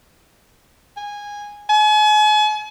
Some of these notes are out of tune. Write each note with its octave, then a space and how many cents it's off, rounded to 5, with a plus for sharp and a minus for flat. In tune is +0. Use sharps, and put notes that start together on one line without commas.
G#5 -15
G#5 +40